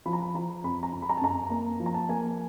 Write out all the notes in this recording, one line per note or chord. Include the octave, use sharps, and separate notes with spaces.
F3 B5
A#5
B5
F3 A#5
F2 B5
A#5
F2
B5
A#5
A5
F#2 A#5
A#3
F3
A#5
A5
A#3 G#5